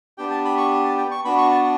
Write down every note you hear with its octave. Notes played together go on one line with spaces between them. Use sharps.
B3 D4 G4 G5
A5
B5
C#6
A5
G5
C#6
B3 D4 F#4 B5
C#6
A5